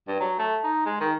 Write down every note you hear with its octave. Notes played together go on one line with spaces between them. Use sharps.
G2
F#3
A3
D#4
G#3
D#3